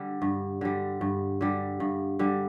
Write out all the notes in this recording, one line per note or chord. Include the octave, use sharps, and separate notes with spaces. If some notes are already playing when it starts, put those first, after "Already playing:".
Already playing: D3 G3
G2
D3 G3
G2
D3 G3
G2
D3 G3